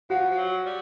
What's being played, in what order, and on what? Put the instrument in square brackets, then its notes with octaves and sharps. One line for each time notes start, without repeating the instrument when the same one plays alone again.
[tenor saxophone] F3 [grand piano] F#4
[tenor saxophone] F3
F#3
G3